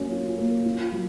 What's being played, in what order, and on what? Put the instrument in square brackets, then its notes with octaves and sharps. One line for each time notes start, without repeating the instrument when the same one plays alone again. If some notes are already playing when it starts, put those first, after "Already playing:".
Already playing: [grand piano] F#3 A#3 C#4
F4
A#3
F4
F#3